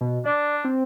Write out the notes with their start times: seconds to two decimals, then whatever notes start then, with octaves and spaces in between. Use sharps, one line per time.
0.01 B2
0.26 D4 D5
0.65 C4